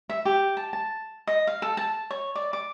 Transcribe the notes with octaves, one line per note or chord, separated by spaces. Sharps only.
E5
G4
A5
A5
D#5
F5
A4
A5
C#5
D5
D6